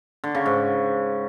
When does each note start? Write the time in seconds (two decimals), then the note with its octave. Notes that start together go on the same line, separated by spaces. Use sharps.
0.24 D3
0.35 C#3
0.46 G#2